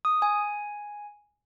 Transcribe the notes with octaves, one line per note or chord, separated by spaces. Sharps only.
D#6
G#5